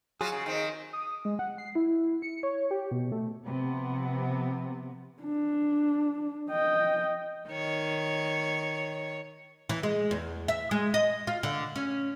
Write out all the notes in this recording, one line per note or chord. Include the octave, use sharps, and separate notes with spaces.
F#3 F4 F#4 G#4
C#3
D#3 C4
D#6
G#3
F#5
C7
E4
C#7
C#5
G4
B2
A3
C3 F3 B3
D4
D#5 G5
D#3 C#5
E3
G#3
E2
E5
G#3
D#5
F4
D3
C#4